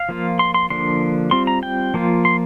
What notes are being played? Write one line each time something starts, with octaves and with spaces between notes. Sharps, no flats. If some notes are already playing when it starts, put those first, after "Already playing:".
Already playing: F5
F3 A#3 F4
C6
C6
D3 F3 A#3 D4 C6
G3 C4 F4 C6
A#5
G5
F3 A#3 F4
C6